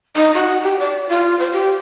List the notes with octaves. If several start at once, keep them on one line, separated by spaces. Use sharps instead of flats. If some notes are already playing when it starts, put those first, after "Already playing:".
D#4
F#4
G4
D5
F4
C5
G4